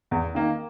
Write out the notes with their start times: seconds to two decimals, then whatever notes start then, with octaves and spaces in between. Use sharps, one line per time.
0.11 E2
0.35 D#3 A#3